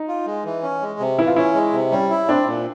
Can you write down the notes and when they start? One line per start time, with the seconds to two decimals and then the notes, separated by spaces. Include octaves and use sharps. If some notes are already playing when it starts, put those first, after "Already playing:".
Already playing: D#4
0.08 F4
0.26 G#3
0.45 E3
0.63 C#4
0.81 G#3
0.99 C3
1.19 E3 E4
1.27 F4
1.36 C#4 E4
1.55 G#3
1.73 C3
1.91 G3 C#4
2.10 E4
2.28 C4 D4
2.46 A#2